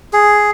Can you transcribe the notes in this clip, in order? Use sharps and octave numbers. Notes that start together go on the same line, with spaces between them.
G#4